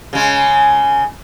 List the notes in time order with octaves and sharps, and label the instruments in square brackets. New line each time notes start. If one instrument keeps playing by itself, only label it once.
[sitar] C#3 G#3